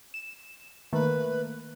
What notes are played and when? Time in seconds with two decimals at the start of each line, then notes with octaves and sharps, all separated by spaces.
0.14 E7
0.93 D#3 A3 A#3 B4